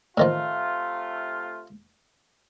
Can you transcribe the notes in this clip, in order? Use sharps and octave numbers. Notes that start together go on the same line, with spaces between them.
A2 C3 D#3 F3 A3 F4